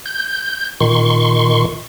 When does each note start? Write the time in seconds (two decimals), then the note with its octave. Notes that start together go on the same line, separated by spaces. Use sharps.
0.06 G6
0.81 A#2 D#3 C6 C#6